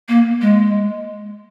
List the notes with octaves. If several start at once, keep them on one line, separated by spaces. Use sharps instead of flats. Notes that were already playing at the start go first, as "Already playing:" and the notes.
A#3
G#3